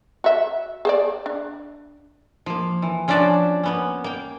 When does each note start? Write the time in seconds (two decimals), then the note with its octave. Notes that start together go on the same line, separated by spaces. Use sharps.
0.24 F#4 E5
0.85 G#4 C5 D5
1.26 D4
2.46 F3 A#3
2.82 E3
3.08 F3 C#4 D4 F#4 D5 E5
3.63 A#3 B3 C#4
4.04 A#3 G5